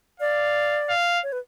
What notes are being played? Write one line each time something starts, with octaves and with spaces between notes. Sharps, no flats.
D5 F5
F5
C#5
B4